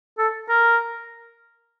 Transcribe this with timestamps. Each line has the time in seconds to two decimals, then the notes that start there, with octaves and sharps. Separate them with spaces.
0.18 A4
0.49 A#4